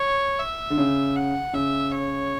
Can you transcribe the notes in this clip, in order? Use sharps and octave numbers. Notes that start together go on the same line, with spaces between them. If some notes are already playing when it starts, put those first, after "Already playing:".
Already playing: C#5
E5
D3
C#3
F#5
C#3 E5
C#5